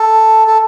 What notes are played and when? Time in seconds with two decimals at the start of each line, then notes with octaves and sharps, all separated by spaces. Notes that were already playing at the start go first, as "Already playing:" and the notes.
Already playing: A4
0.47 A4